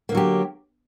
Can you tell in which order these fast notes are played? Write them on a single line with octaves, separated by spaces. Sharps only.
A#3 D3 F#3 G4